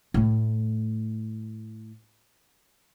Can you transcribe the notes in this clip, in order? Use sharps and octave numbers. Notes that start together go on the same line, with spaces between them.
A2 A3